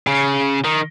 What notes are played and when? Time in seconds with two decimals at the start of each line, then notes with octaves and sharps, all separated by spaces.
0.07 C#3
0.64 D#3